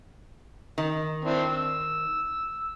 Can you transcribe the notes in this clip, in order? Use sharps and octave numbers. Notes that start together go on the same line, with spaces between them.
D#3
C4 D4 E4
E6